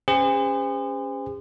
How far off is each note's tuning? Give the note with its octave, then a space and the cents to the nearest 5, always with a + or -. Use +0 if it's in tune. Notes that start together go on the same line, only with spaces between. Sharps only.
C#4 +0 G#4 -40 C5 -35